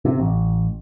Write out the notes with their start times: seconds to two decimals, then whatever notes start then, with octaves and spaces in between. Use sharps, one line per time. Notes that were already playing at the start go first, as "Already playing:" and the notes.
0.05 C3
0.20 A1